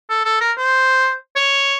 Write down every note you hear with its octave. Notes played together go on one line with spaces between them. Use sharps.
A4
A4
A#4
C5
C#5